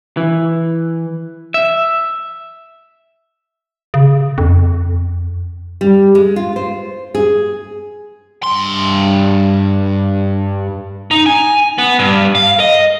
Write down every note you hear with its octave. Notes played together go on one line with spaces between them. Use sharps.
E3
E5
C#3
F2
G3
G#3
F4
C5
G#4
G2 C6
D#4
G#5
B3
G2
F5
D#5